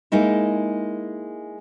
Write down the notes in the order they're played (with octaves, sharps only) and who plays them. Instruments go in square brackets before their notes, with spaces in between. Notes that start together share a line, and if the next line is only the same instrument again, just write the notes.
[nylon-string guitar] G#3 A#3 D#4 E4